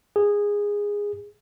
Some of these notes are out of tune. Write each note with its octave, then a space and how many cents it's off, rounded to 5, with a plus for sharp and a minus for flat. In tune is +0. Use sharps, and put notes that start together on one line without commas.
G#4 -15